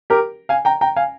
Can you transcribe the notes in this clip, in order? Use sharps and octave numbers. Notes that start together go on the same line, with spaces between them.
G4 A#4
F5 G#5
G5 A#5
G5 A#5
F5 G#5